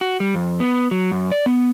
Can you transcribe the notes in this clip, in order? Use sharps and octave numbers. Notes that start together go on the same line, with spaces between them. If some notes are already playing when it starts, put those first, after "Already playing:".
F#4
G3
F2
B3
F#3
F#2
D5
B3